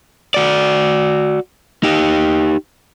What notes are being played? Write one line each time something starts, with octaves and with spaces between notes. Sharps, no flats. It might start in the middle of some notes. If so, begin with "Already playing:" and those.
F#4 D5
D#4 G4